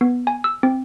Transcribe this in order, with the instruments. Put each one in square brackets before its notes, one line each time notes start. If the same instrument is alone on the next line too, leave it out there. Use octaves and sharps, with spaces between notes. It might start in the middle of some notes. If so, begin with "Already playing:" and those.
[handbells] B3
G#5
E6
C4